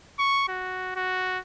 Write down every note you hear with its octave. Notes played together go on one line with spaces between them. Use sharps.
C#6
F#4
F#4